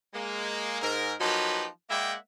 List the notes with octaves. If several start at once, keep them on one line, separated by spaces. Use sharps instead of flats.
G#3 A#3
G#2 A#4
F3 F#3 A#3 D#4 G4 B4
G#3 A#3 D5 E5 F#5 G5